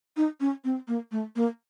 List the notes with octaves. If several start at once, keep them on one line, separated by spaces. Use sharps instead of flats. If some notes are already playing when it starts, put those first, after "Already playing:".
D#4
C#4
C4
A#3
A3
A#3